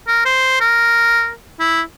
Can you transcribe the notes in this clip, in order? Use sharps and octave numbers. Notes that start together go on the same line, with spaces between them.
A#4
C5
A#4
E4